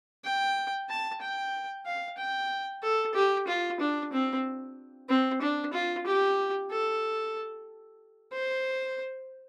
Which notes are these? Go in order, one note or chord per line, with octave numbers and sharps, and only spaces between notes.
G5
A5
G5
F5
G5
A4
G4
F4
D4
C4
C4
D4
F4
G4
A4
C5